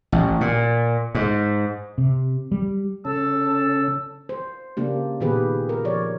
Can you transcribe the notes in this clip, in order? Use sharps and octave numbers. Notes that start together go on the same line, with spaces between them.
A1
A#2
G#2
C3
G3
C#3 C#4 A4 A5 E6
C5
C#3 A#3 D4 G4
A#2 D#3 B3 G4 G#4 B4
A#4
F3 C#5 D5